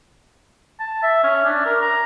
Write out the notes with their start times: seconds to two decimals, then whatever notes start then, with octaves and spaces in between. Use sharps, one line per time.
0.80 A5
1.03 E5
1.23 C#4
1.44 D4
1.66 A#4
1.82 A#5